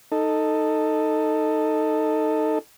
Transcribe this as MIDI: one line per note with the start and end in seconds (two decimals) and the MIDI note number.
0.12 2.59 63
0.12 2.59 69